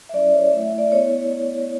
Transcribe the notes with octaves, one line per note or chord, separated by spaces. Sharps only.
E5
F#3 C#4 E4 D5
C#5
A3 E4 E5
D5
B3 E4 C#5